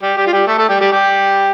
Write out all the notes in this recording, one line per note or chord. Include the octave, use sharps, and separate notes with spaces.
G3 G4
G3 G4
F4
G3 G4
A3 A4
A3 A4
G3 G4
G3 G4
G3 G4